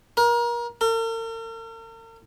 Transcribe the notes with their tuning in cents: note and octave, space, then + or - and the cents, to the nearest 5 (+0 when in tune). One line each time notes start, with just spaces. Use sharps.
A#4 +30
A#4 -45